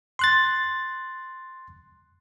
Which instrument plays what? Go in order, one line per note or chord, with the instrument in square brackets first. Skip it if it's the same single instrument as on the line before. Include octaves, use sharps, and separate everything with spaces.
[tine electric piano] C6 F#6 A6